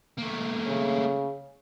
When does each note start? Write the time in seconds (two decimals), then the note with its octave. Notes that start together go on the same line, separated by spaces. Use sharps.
0.18 A3 A#3
0.66 C#3